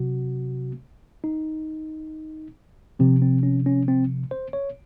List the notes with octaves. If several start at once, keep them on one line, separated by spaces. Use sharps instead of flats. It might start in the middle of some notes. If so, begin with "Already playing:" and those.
Already playing: C3 F#3 F#4
D#4
C3 F3 C4
C4
C#4
C#4
C4
C5
C#5